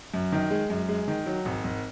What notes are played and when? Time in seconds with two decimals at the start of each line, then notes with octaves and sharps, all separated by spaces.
0.14 F#2
0.32 D#3
0.51 G#3
0.70 F#2
0.89 G#3
1.08 D#3
1.26 F#3
1.45 G#1
1.64 G#1